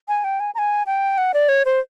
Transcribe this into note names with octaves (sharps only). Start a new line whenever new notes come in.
G#5
G5
G#5
A#5
G#5
G5
F#5
D5
C#5
C5